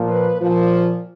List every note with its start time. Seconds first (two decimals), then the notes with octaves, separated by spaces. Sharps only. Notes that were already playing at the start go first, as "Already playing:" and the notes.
Already playing: A#2 F3
0.09 B4
0.41 A#2 F3